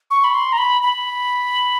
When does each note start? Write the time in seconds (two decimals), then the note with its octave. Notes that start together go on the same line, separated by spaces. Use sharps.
0.11 C#6
0.24 B5
0.34 C6
0.52 A#5
0.58 B5
0.82 B5